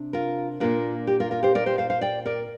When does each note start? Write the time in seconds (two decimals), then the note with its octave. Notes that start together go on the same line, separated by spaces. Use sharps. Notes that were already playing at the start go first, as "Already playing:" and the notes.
Already playing: C3 D4
0.13 F4 A#4
0.60 A#2 A#3 D4 F4 A#4
1.07 G4
1.20 F4 A#4
1.31 F4 A#4
1.43 G4 C5
1.55 A#4 D5
1.66 G4 C5
1.78 C5 F5
1.90 C5 F5
2.01 D5 G5
2.26 A#4 D5